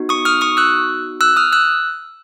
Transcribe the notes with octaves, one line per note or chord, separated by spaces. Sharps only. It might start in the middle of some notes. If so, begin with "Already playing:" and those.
Already playing: B3 D#4 F#4
C#6 D#6
D#6 F6
C#6 D#6
E6 F#6
E6 F#6
D#6 F6
E6 F#6